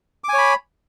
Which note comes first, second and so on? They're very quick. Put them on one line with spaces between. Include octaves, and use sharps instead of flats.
D6 G#5 C#5 B5